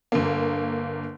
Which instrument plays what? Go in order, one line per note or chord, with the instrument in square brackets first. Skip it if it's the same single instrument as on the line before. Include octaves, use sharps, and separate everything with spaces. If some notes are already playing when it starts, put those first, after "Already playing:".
[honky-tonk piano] G1 D3 A#3